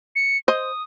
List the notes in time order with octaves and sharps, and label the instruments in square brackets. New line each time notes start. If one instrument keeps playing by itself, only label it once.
[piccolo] C#7
[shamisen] C5 D#5 [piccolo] D#6